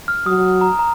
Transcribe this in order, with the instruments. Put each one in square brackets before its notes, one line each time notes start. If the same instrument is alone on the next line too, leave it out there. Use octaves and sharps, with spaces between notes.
[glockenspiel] F6
[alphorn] F#3 [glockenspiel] D#6
[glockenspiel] A#5
A#5